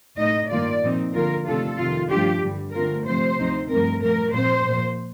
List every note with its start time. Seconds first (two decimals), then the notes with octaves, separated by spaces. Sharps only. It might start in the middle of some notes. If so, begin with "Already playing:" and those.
0.18 A2 A3 D#4 D#5
0.51 G2 D#3 A#3 F4 D5
0.82 A#2 F3 C4 D#4
1.14 D3 F3 A#3 F4 A#4
1.46 C3 D#3 A3 D4 F4 A4
1.78 F2 C3 D#3 F4
2.10 G2 F3 A3 D4 F4 G4
2.42 G2 D3 G3
2.74 D3 A3 C4 F4 A#4
3.06 C3 F3 A3 C5
3.38 D2 C3 F3 C4 D#4
3.70 G2 F3 A3 C4 A#4
4.02 A#2 F3 A3 A#4
4.33 A#2 F3 C4 C5
4.66 A#2 F3 A#3